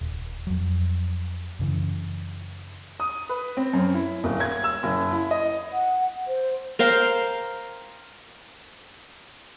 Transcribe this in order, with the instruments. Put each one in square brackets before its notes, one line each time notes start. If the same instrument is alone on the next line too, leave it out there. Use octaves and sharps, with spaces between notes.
[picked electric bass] D#1
F2 F#3
F#2 C#3 E3
[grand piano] D#6
B4
C4
F#2
E4
D#1
G#6
E6
F#1
E4
D#5
[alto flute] F#5
C5
[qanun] A#4 C5 F5 G5